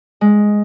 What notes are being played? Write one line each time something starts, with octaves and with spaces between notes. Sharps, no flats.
G#3